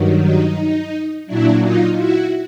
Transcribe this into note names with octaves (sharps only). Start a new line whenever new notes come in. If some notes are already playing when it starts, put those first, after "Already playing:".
Already playing: G2 D#3 F#3
D#4
A#2 F#3 D4 E4
D#4 F4
E4 F#4